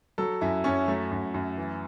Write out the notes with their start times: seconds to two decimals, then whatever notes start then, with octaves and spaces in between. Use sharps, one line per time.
0.18 F#3 A4
0.41 F#2 E4
0.64 F#2 C#4
0.88 F#3 A3
1.12 F#2
1.34 F#2
1.57 E3